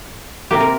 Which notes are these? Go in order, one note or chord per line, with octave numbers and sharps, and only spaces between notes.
C3 A#3 G4
A#4